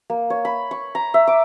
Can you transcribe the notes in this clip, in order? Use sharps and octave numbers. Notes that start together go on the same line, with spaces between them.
A#3
C#5
B5
C#6
A#5
E5
D6